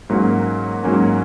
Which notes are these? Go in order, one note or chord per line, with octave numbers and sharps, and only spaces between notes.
G#2 F#3 A#3 C#4
G#2 F#3 A#3 C#4